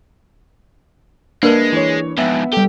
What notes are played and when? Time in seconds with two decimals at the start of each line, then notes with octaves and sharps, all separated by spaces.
1.43 G#3 A#3 D4 A#4 B4
1.72 E3 C#5
2.18 F2 G#2 B3 E5
2.53 G3 G4 A4